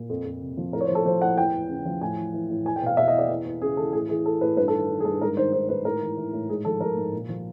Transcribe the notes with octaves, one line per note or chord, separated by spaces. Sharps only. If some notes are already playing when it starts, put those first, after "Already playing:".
Already playing: A#2
F2
F2
C3
F3
A2 A#4
C#5
C5
F3
A4
F3 C5
A2 F#5
E2 G5
E2
C#3
F3
A2 G#5
E3
E3
A2
E2 G#5
G5
B2 F5
B2 E5
D#5
E2
D5
E2
E2
C#3 G#4
E3 A4
A2 G#4
E3 G#4
E3 A4
A2 B4
G2 B4
A4
D#3
D#3
G#4
G2 A4
G#2 A#4
D#3 C5
D#3 C5
G#2 B4
A2 A#4
E3
E3
A2
G#2 G#4
F3 A4
F3 A#4
G#2
A#2
F3